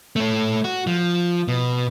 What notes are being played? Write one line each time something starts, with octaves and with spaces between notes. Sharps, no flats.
A3 C#5
F#4
F3
B2